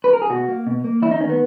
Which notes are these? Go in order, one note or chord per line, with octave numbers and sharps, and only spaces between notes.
B4
A#4
G#4
B2 F#4
A#3
B2
A#3
E2 E4
D#4
D#3 A#3 C#4
B3